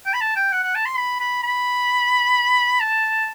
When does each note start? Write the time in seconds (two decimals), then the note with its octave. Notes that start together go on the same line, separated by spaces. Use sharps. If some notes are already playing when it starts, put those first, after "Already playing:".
0.06 G5
0.13 B5
0.21 A5
0.36 G5
0.52 F#5
0.63 F#5
0.75 A5
0.85 C6
0.97 B5
1.20 B5
1.43 B5
2.80 A5